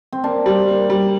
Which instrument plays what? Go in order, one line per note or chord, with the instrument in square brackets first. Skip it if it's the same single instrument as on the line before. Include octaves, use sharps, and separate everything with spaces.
[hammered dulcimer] C4
[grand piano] A#3 [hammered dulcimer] D4
[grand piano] G3
A#3
G3